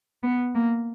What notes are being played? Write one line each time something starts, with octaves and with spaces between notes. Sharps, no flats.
B3
A#3